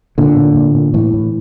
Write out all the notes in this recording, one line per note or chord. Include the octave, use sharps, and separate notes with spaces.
A#2 D3
A#2
A#2
A#2
A2 E3
A2